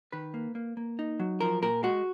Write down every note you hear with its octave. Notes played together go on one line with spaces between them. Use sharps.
D#3 B4
A#3
A#3
A#3
D#4
F#3
F3 A#4
A#2 A#4
G#3 F#4